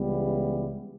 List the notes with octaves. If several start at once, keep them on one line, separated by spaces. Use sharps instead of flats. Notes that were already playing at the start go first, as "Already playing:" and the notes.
Already playing: C#2 C#3 E3 G3 B3